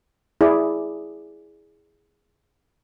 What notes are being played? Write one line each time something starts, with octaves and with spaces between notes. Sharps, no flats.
E4 G#4 D5